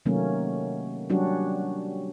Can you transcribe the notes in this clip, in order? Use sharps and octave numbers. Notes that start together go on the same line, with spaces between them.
C3 D#3 F#3 A3 A#3 C#4
F#3 G3 C#4 D4 F#4 G4